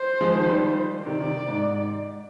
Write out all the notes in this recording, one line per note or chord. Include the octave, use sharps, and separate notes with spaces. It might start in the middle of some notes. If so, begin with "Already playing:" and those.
Already playing: C5
F3 G#3
D#3
F3
D#3 G3
C3 D#3 D5
C3 D#3
G#2